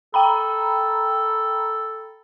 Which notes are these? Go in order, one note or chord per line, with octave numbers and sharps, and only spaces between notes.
A4 G5 A#5 B5